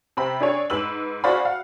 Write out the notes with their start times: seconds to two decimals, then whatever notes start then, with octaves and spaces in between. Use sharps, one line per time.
0.17 C3 C4 B5 E6
0.41 D4 G#4 C#5
0.70 G#2 B4 E6 F#7
1.24 F#4 G#4 C5 D5 F5 B5
1.45 F5 F#5